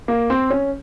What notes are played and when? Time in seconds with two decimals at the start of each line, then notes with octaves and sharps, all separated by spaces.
0.08 A#3
0.30 C4
0.50 C#4